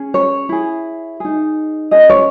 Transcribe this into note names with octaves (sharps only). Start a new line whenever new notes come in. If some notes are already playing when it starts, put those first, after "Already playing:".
Already playing: C#4 G#4
C#5
E4 G#4
D#4 G#4
C#4 G#4 D#5
C#5